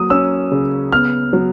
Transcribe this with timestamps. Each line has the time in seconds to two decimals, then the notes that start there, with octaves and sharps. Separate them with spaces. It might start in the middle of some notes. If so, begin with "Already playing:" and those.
Already playing: F#3 A#3 D#6
0.10 C#4 E6
0.52 C#3
0.92 B3 F6
1.33 F#3